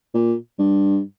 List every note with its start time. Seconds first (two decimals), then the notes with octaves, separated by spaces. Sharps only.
0.14 A#2
0.59 G2